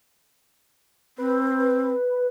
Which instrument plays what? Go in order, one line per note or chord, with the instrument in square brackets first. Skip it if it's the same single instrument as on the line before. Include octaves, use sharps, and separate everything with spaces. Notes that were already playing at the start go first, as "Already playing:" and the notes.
[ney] C4 [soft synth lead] B4